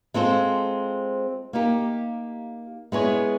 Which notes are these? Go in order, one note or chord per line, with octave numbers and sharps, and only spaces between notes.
G#3 C4 F4 A4 C5
A#3 D#4 G4
G#3 B3 E4 G#4 C#5